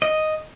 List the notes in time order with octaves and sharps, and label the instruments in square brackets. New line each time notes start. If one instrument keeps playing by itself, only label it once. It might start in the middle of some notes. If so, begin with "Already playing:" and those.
[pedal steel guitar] D#5